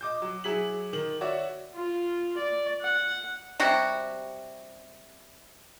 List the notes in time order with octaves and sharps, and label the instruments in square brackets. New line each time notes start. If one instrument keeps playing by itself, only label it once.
[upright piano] D#5 D6 G6
F#3
F#3 E4 G#4 B6 F#7
D#3 F#7
F#4 C#5 D5 E5
[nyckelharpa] F4
D5
F#5
[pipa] C3 G3 F#4